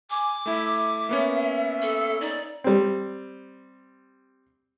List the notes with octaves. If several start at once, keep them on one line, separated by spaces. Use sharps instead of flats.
G#5 D6
A3 E4 E5
A#3 B3 C#4
A4
D#4 D5
G3 C4